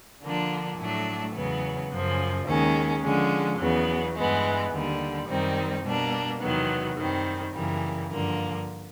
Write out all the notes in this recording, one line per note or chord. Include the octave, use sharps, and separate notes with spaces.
D3 F3 A#3 D4
A2 F#3 A3 D4
E2 C#3 F#3 B3
F#2 C#3 F3
D#2 D#3 G#3 C#4
D3 F3 G#3 C#4
E2 C#3 F#3 B3
G2 E3 G#3 B3
D#2 D3 G3
F#2 D#3 G3 C4 D#4
B2 G3 A#3 D4
E2 C3 D#3 F#3 B3
F#2 D#3 G3 C4
F#2 C#3 E3 G3 A#3
G2 D3 F3 A#3